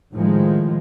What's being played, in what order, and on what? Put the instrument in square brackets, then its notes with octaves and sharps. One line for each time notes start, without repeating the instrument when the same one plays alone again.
[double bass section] A2 D#3 F3 G#3